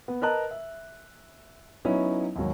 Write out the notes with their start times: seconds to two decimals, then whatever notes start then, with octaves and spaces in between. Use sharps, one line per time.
0.08 B3
0.22 A#4 B4 D#5 A5 A#5 F#6
0.51 E5
1.85 F#3 B3 C#4 D#4 E4
2.36 D#2 G#2 F#3